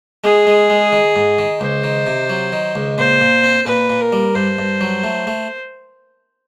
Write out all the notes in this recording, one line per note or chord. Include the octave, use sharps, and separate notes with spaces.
G#3 G#4
G#3
G#3
D#3
G#2
D#3
C#2 C5
D#3
C3
F#3
D#3
C#2
A#2 C5
A#2
C4
A#2 B4
A#2
A#4
G3
G2 C5
G2
F#3
A3
A3